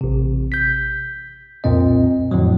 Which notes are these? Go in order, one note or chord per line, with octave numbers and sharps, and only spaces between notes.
A1 C3
G6 B6
C2 F2 A#2 C4 D#5
F2 A2 D3 F3 F#3